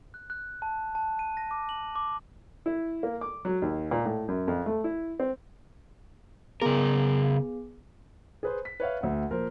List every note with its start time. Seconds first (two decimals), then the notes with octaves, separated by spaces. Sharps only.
0.14 F#6
0.30 F#6
0.62 A5
0.95 A5
1.19 D#7
1.37 A#6
1.51 D6
1.69 F#7
1.96 D6
2.66 E4
3.03 A#3
3.21 D6
3.45 F#3
3.62 D#2
3.91 A#2
4.06 A2
4.28 F#2
4.48 F2
4.66 A3
4.84 E4
5.20 C4
6.62 C#3 B3 G#4 A#4
8.43 G#4 B4 C5
8.65 B6
8.80 B4 C#5 E5 F5
9.01 D2 E5 F#5
9.31 A#2 F3 A#4 C5